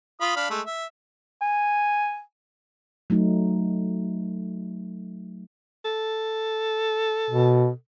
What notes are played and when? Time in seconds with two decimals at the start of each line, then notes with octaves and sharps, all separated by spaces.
0.21 F4 B5 D#6
0.36 D4 F5 B5
0.50 G#3 A3
0.66 E5
1.42 G#5
3.10 F#3 A3 D#4
5.85 A4
7.30 B2